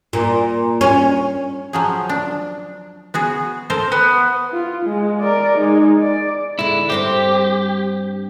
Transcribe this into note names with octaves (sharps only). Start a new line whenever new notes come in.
A#2
C#4
F3 F#3 G#4
D4
B3 F#4 G#4
A4 A#4 C5
B3
F4
G#3
A#4 D5
G#3 D#4
D5
D3 G#3 E4
G2 C4 G4 C5